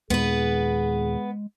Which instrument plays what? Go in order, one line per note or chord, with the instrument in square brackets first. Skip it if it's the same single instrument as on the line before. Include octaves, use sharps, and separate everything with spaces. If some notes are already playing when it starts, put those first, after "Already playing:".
[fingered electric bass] D#2 A#2 D#3 [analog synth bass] G#3 [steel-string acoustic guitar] B3 B4 [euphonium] G#4